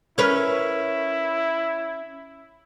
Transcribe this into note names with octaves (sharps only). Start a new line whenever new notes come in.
C#4 E4 A#4 B4